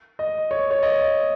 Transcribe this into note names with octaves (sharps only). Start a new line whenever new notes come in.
D#5
C#5
C#5
D#5